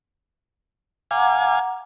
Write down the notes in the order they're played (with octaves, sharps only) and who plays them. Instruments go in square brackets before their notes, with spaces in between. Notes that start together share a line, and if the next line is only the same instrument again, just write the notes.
[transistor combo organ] F5 G#5 [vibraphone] F#5 A#5 D6